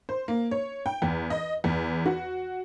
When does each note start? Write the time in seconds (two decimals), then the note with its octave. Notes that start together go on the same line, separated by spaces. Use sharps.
0.09 C5
0.28 A#3
0.51 C#5
0.86 G5
1.02 E2
1.30 D#5
1.64 E2
2.06 F#4